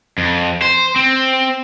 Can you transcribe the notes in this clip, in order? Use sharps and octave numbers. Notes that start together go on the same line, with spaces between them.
F2
C5
C4